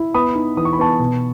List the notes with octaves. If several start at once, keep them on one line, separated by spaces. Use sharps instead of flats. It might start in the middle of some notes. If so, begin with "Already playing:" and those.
Already playing: E4
B3 B5 D#6
D#4
E3 D#6
C#6
B5
B3 A5 C#6
B2